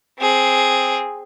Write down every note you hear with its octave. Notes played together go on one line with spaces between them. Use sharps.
C4 G#4